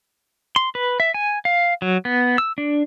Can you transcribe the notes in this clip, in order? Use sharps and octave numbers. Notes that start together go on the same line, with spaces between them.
C6
B4
E5
G#5
F5
F#3
B3
E6
D4